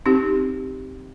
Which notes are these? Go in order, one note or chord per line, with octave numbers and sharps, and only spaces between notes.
C4 D#4 G4